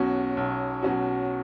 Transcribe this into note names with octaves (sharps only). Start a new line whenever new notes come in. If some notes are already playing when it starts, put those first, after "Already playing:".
Already playing: B1 B2 F#3 C#4 F#4
B1
B2 F#3 C#4 F#4